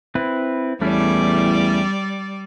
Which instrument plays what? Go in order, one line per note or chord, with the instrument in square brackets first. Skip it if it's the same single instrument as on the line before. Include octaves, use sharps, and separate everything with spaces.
[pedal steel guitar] C4 E4 B4
[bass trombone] E2 [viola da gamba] G3 D5 [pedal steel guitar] A3 C#4 E4